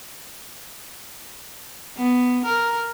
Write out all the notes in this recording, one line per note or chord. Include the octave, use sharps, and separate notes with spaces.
B3
A#4